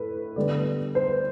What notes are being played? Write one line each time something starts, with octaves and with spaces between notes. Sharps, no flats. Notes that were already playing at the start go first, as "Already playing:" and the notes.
Already playing: A2 B4
D3 G3 B3 D5
C5